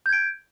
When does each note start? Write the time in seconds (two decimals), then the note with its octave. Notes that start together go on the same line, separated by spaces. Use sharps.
0.06 G6
0.09 G#6
0.13 D7